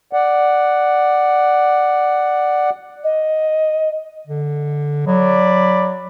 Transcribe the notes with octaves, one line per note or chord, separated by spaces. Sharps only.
D5 F#5
D#5
D3
F#3 D5 B5